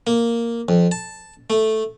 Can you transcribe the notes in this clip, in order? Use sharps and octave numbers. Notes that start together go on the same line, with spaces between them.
A#3
F2
A5
A3